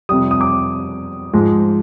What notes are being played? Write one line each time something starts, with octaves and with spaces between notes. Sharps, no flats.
F2 C3 G3 D#6
D#6
D6
G#2 F3 G#3